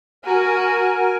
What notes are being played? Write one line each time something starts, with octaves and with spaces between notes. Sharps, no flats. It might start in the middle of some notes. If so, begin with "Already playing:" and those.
F#4 A#4 G#5